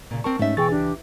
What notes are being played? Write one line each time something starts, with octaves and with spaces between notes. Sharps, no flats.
A#2 C#3
C4 A#4 A5 C#6
G#2 A3 C#4 D#4 E5
B2 E3 G#4 G5 C#6 E6 A6
C#2 D4 G4